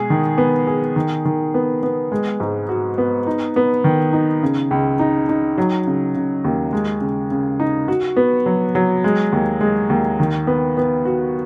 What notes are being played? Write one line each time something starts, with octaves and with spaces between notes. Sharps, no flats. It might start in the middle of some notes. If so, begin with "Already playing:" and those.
Already playing: B2 G#3 G#4
D#3
B3
G#4
D#3
D#3
B3
B3
G#3
G#2
F#4
B3
D#4
B3
D#3
D#4
C#3
C#2
D#4
D#4
F#3
C#3
C#3
D#2
G#3
C#3
C#3
D#4
F#4
B3
F#3
F#3
G#3
D#2
G#3
D#2
D#3
B3
B3
F#4